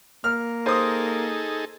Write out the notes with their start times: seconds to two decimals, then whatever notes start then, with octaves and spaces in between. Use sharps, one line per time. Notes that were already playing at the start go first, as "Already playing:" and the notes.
0.24 A#3 F6
0.66 D#4 G#4 A4 C5 D#6